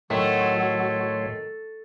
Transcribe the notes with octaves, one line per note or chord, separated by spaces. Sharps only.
A2 D#3 F#3 A3 C#5 C6